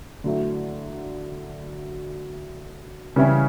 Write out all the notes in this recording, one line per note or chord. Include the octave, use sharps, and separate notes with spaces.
D3 F#3 A3 E4
C#3 E3 G3 C#4 E4